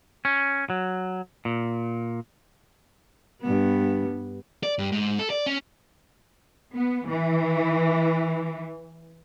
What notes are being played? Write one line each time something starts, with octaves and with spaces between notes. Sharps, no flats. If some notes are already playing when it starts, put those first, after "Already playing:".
C#4
F#3
A#2
G2 B3
D5
G2
G#2
A4
D5
C#4
B3
E3